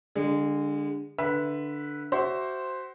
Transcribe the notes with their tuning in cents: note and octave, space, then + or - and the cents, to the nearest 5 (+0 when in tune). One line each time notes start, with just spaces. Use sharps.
D3 +0 G#3 -35
D3 +0 B4 -15 E5 +10
F#4 +25 C5 +0 E5 +0